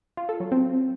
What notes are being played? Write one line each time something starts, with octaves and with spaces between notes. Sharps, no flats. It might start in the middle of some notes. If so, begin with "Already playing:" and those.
F4
A4
F#3
C4